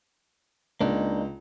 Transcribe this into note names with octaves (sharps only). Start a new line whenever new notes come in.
C#2 A#3 D4 D#4